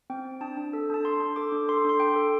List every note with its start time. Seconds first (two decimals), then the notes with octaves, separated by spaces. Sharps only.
0.10 C4 G5
0.25 C4
0.41 D4 A5
0.57 D4
0.73 A4
0.90 D4 A5
1.05 D4 C6
1.20 D4
1.36 A4 D6
1.52 D4
1.69 A4 C6
1.79 D6
1.85 D4 C6
2.00 D4 G5
2.16 A4